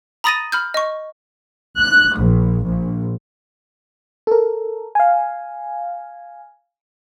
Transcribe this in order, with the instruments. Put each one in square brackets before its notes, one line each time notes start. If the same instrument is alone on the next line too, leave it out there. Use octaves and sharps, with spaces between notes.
[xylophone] A#5 B5 D#6 A6 A#6 D#7
B5 F6 G6
D#5 C#6
[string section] F#6
A#1
A#1
[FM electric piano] A4 A#4
F5 G#5